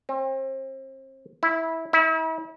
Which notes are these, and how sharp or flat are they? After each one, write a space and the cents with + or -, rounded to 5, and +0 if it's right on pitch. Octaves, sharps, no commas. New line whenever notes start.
C4 +35
E4 -15
E4 -40